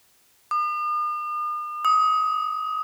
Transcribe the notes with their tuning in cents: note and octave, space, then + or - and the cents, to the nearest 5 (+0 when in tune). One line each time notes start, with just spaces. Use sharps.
D#6 -45
D#6 +25